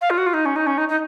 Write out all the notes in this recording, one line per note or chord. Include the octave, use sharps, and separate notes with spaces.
F5
F4
F#4
F4
D#4
C#4
D#4
C#4
D#4
D#4